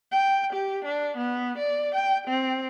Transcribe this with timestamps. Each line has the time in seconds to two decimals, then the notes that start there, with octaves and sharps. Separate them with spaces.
0.12 G5
0.53 G4
0.85 D4
1.17 B3
1.58 D5
1.95 G5
2.28 C4